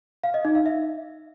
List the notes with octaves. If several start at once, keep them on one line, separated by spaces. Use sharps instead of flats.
F5
D#5
D#4
F5
E5